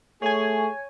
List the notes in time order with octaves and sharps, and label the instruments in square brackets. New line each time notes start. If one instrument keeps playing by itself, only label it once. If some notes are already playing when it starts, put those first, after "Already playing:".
[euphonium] A3 [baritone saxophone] G#4 [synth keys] C#5 G#5